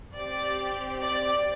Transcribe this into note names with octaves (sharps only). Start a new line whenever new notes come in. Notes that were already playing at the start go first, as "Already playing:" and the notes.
C4 G4 D5
D5